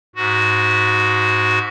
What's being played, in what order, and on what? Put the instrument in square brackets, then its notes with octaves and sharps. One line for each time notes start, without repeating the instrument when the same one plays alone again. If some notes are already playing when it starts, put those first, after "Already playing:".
[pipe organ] G#2 F#4